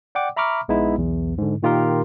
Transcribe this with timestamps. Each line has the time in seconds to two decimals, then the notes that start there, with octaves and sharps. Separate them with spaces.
0.15 D5 F#5 G5 D6
0.36 E5 A#5 B5 C#6 D6 F6
0.69 A#1 G#3 B3 D#4 E4
0.98 B1 E2
1.38 G#2 D3
1.63 A#2 D#3 F4 G4 A#4 C6